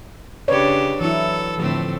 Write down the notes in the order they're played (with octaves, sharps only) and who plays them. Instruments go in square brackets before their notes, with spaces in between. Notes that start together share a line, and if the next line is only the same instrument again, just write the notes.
[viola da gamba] C#3 D4 G4 [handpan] B4 C#5 D5
[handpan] E3 E4 [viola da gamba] F#3 A4
[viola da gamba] A2 A3 C4 [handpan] D3 F3